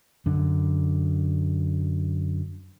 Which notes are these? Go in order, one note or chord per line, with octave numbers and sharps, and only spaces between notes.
F#2 D3